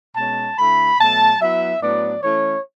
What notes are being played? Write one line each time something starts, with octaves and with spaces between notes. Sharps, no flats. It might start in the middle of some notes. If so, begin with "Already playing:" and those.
B2 G#3 C#4 A5
D3 A3 E4 B5
B2 F#3 A3 A5
F#3 B3 E4 E5
A2 F#3 B3 D4 D5
E3 A3 C#4 E4 C#5